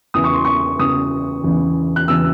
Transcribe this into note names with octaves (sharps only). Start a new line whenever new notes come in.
E2 C#3 E3 D#6
C#6
C6
C#6
E2 C#3 E3 D#6
E2 C#3 E3
F#6
E2 C#3 E3 E6